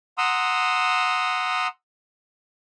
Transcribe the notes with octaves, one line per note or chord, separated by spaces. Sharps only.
F#5 A#5 C6 D#6 E6